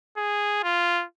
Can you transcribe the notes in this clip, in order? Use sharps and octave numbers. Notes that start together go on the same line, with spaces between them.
G#4
F4